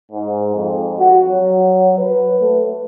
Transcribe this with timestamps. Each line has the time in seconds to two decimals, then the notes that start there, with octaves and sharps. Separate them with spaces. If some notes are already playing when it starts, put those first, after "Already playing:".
0.12 G#2
0.55 F2
0.99 F#4
1.28 F#3
1.98 B4
2.41 A3